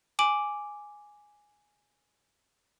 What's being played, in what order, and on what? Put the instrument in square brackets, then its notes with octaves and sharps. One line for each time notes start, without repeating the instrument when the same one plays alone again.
[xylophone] G#5 D6 D7 F#7